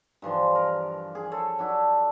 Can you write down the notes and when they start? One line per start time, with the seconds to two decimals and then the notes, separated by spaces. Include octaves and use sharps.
0.22 G2 E3 F3 C6
0.55 A#4
1.15 G#4
1.32 A4 C#5
1.58 F#3 D4 E4